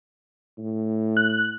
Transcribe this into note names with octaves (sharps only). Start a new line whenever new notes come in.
A2
F#6